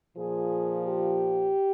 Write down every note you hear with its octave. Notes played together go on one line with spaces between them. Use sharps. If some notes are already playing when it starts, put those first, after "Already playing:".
A#2 F3 G#4
G4